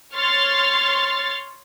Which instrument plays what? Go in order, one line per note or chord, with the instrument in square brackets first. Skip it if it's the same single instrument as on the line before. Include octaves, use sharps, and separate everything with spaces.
[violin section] C#5 C6 F6 A6